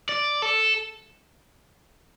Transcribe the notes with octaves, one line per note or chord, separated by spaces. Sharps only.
D5
A4